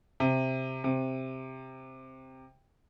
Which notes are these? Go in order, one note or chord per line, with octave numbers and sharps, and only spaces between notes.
C3
C3